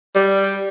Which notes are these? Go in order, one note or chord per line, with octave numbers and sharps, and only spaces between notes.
G3